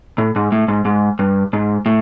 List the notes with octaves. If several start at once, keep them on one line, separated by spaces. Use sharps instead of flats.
A2
G#2
A2
G#2
G#2
G2
G#2
A2